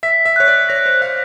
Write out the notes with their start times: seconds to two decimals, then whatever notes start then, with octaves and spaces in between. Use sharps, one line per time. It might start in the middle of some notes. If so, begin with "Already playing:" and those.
0.03 E5 B6
0.25 E5
0.36 C#5 F#6
0.48 D5
0.69 C#5 A#6
0.86 C5
1.01 F5 F#6